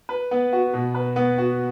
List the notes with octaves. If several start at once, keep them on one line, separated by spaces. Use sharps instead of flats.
B4
B3
F#4
B2
B4
B3
F#4